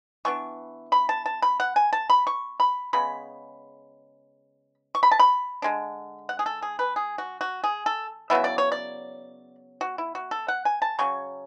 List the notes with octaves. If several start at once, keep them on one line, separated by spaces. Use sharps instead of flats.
E3 B3 D4 C#6
B5
A5
A5
B5
F#5
G#5
A5
B5
C#6
B5
C#3 G#3 B3 B5
C#6
B5
A5
B5
D3 G#3 D4
F#5
G#4
A4
G#4
B4
G#4
F#4
F#4
G#4
A4
C#3 F#3 B3 E4 E5
D5
C#5
D5
F#4
E4
F#4
A4
F#5
G#5
A5
C#3 F#3 C#4 C#6